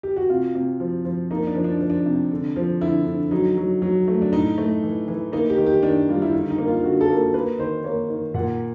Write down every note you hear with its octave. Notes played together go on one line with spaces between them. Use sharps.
G4
F#4
C3 F4
C3
F3
F3
A#3 D#4
D4
F3
D4
F3
D4
C3
D3
F3
D3 E4
D3
F#3 D#4
F#3
F#3
A3
D4
A2 D#4
A3
E3
E3
A#3 D#4
G4
D#3
G4
D#3 D4
G3 F4
E4
D3 D#4
D#4
A#3
F4
D3 F#4
A4
A#3
A4
A#3 B4
D#3 C5
A#3 C#5
D#3
A#2 F#5